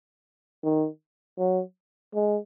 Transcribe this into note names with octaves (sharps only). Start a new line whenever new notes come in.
D#3
F#3
G#3